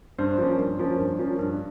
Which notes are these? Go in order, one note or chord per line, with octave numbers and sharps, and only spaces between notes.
G2 C5
F3 A#3 C#4
G2
F3 A#3 C#4
G2
F3 A#3 C#4
G2